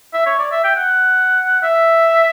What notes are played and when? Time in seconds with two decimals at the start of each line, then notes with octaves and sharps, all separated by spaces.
0.14 E5
0.26 C#5
0.39 D5
0.51 E5
0.64 G5
0.76 F#5
1.63 E5